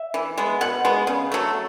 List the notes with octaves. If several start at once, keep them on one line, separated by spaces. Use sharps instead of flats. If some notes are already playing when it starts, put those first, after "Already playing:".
Already playing: E5
E3
G#3 B3
B2 F#5
G#3 B3
C#3
F#3 A3